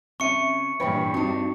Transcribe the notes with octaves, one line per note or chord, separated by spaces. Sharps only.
C#3 C4 C#4 E5 C#6 C#7 D#7
G2 A#2 E3 B4 C#5 G5 B5
C4 D4 D#4 F#4